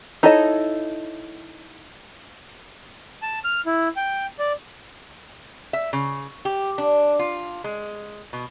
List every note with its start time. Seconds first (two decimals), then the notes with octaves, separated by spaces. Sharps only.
0.23 D#4 E4 A4 C#5 D#5
3.22 A5
3.44 F6
3.66 E4
3.96 G5
4.39 D5
5.73 E5
5.93 C#3
6.45 G4
6.78 D4
7.19 F4
7.64 G#3
8.33 B2